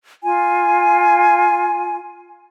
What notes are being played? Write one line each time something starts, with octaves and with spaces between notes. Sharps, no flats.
F4 G#5